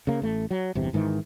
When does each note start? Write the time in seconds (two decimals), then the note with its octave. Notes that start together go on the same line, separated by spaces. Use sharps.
0.07 C#3 A#3
0.22 A1 A3
0.51 F#3
0.75 G1 E2 C3
0.93 G#1 G#2 D#3 E3